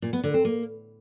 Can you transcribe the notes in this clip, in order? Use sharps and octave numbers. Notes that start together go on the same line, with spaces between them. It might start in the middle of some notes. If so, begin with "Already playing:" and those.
A#2
B3
D3
C4
A#3